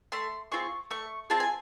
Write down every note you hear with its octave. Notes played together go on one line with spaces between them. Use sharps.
A3 C6
C4 F4 G#4 C#6
A3 C#6
C4 F4 G#4 A5
G#5